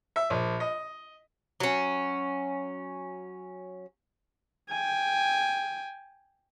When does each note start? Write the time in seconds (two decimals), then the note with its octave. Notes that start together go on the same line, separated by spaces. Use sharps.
0.16 E5
0.30 A#1
0.60 D#5
1.60 F#3 C#4
4.70 G5 G#5